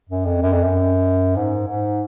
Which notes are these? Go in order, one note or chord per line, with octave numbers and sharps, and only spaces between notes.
F#2
F2
F#2
F2
F#2
G#2
G#2